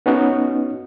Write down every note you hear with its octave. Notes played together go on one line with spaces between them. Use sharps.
B3 C#4 D#4 F#4